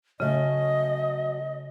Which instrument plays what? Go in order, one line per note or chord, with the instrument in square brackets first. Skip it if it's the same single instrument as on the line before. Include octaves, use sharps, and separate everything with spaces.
[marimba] C#3 [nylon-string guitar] F#3 A3 C#4 [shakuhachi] D#5